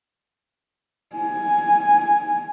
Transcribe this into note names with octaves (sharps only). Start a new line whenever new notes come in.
G#5